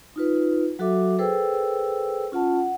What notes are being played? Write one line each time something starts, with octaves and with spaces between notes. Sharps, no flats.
D#4 F4 B4
F#3 F#4 A4 E5 D6
G#4 A4 B4 C5 G5 E6
C#4 F4 F#5 A5
F#5